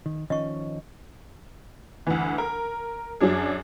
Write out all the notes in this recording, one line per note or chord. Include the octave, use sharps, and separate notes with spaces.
D#3
D#3 F3 C#4 D#5 C#6
D2 E3
A#4
F#2 F#3 D4 G#4